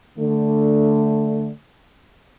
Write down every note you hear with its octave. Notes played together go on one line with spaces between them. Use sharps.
D3 A3